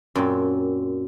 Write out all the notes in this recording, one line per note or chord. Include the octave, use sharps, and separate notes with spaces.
F#2 A#2 C4